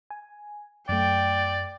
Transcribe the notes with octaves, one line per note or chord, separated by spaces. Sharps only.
G#5
F#2 A3 D5 G5